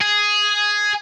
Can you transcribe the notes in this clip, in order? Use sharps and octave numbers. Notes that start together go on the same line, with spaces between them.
G#4